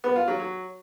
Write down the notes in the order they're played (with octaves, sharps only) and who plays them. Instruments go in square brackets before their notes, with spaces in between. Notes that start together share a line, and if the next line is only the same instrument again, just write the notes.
[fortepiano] B3
F4
F#3
F#3